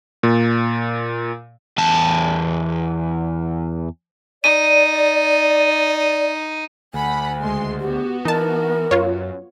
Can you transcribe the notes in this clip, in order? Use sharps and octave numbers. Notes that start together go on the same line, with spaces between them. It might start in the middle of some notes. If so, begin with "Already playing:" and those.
A#2
E2 A5
D#4 D5 D#7
D2 F#5 G#5 B5
C#2 G#3 C6
B3 F#4 G4
E3 D#4 A#4 A5
F#2 F4 C#5